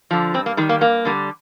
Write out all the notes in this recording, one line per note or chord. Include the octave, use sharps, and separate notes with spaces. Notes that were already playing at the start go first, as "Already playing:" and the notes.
D3 F3
G2 C4
A#3
D#3 G3 G#3
A#3
G2 A#3
D3 G3